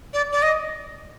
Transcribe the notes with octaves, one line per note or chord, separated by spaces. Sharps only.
D5
D5
D#5